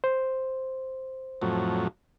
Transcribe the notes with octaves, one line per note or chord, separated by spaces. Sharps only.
C5
F2 A2 F#3